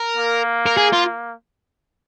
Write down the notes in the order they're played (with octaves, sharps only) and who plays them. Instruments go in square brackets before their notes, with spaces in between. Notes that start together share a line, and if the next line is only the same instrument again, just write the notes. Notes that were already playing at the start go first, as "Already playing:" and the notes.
Already playing: [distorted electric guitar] A#4
[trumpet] A#3
[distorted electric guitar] A#4
G#4
F4